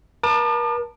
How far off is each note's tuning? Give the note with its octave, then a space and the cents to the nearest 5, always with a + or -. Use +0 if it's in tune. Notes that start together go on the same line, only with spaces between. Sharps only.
A#4 +40 A5 +15 D6 +45